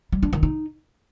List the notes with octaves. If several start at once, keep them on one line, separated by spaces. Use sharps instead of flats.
G3
D4
D#3
D#4